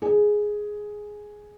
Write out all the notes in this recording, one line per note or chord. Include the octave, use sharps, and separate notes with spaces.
G#4